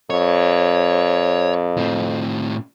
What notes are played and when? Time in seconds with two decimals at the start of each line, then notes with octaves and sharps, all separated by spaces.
0.10 F2 C#5
1.77 A2 C4